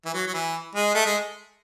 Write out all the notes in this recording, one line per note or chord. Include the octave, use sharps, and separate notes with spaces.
E3
F#3
F#3
E3
G#3
A3
G#3